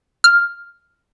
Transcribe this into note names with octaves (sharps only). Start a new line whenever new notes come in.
F6